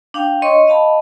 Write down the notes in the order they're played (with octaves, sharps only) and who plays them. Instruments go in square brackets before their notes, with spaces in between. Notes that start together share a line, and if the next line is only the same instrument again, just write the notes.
[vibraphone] D4 F5 G5
C#5 D#5 C6 C#6
D#5 F5 A5 B5